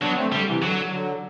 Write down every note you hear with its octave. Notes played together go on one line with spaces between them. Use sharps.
F#3 B3 D4
A3 C4
D3 G3
C3 E3
D3 F#3
D3 F#3